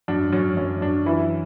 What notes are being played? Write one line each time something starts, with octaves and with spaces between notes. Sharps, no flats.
F#2 D4
F#2 C#4
F#2 C#4
F#2 D4
E3 E4